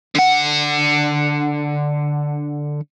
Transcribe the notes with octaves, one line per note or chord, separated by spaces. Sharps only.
D3 F#5